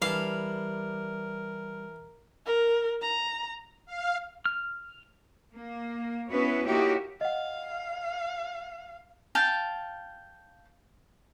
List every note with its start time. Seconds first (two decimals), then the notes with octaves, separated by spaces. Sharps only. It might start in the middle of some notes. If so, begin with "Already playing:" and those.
0.02 E3 G3 A#4 F5 A5
2.46 A#4
3.02 A#5
3.86 F5
4.45 F6
5.54 A#3
6.30 B3 C#4 E4 F#4 B4 C#5
6.64 A#3 D#4 E4 F#4 G4 C#5
7.21 D#5 F5 F#5
9.35 F5 G5 A5